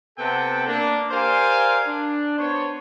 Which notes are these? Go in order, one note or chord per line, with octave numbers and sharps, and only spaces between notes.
C3 B3 A4 F#5 G5 A5
A#3 D4
G4 A#4 C5 D5 F5 G#5
D4
B3 D4 C5 C#5